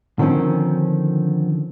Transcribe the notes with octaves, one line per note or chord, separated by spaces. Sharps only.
D3 D#3 F3 C4 C#4